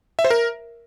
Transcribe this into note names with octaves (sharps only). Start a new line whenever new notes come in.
E5
C5
A#4